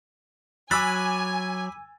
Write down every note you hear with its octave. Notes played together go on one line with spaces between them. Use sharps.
F#3 G#5 B5 D6 E6 F#6 A6